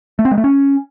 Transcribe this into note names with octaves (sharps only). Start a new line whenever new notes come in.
A3
C4
G#3
A3
C#4